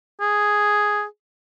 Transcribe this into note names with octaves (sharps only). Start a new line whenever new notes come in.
G#4